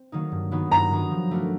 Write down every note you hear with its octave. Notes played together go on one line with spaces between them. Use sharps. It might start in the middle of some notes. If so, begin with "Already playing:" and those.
Already playing: C4
D#3 F#3 A#3 D#4
G2
D#3 F#3 B3 D#4
G2 A#5
D#3 F#3 B3 D#4
F3
A3 D4 F#4 A#4